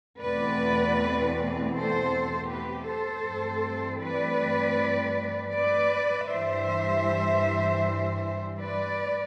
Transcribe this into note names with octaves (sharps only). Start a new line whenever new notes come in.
E2 B2 A3 C4 B4 D5
A4 C5
G4 B4
A4 C5
G2 E3 A3 C4
B4 D5
B4 D5
G2 E3 G3 C5 E5
B4 D5